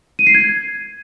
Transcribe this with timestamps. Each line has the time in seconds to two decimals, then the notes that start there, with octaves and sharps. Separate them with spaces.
0.19 D#7
0.27 C7
0.34 G#6